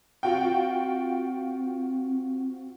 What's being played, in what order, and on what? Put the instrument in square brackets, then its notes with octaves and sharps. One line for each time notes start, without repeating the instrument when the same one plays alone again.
[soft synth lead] C4 [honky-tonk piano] F4 F#4 G5